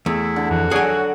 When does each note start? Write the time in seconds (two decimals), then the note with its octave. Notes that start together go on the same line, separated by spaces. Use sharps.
0.06 E2 A3 E4
0.36 D3
0.51 F2 E3 F#4
0.71 F#3 G#4 A4 C#5 D5 F#5 G#5